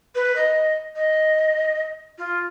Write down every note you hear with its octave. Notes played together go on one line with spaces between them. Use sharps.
B4
D#5
D#5
F4